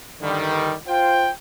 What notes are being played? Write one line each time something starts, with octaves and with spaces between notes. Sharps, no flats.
G2 D3 D#3 G3
F4 C5 G5